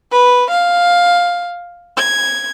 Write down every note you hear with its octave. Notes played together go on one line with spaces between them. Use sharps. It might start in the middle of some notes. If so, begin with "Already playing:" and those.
B4
F5
G#6